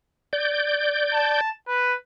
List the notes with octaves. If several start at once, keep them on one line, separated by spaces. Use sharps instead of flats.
D5 G6
A5
B4